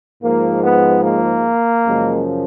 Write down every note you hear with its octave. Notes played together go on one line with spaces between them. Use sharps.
G#2 F3 G#3 A#3
B3
A#3
F#2 C#3 F3 G#3